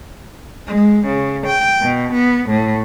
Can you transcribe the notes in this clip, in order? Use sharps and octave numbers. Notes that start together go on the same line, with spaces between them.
G#3
C#3
G5
B2
B3
A2